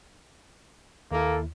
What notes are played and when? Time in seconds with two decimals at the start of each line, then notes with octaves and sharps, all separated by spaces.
1.11 D#2 A#3 E4 A4